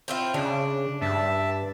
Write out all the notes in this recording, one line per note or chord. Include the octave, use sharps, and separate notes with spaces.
C4 E4 F4
C#3 D4
G2 E5 A5